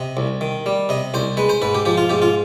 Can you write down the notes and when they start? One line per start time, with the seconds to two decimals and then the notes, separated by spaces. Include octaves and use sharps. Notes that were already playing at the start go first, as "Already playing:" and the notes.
Already playing: C3 D#5
0.17 C2
0.41 D#3
0.66 G3
0.89 C3 D#5
1.14 C2 C5
1.37 G#3 B4
1.49 C5
1.62 G#2 B4
1.75 G4
1.85 F3 G4
1.97 F4
2.10 G#2 G4
2.22 F4